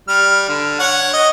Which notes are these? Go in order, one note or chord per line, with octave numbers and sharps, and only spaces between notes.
G3 F6
D3
C#5 F#5
D#5